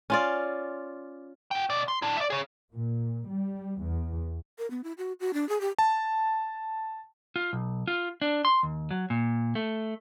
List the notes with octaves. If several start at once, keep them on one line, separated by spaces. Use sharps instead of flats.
C#4 F4 D5
F#4 G5
B2 D5
C6
D4 E4
D5 E5
G#4 C#5
A#2
G3
E2
A#4
B3
E4
F#4
F#4
D4
G#4
G4
A5
F4
B1
F4
D4
C6
D#2
F#3
A#2
A3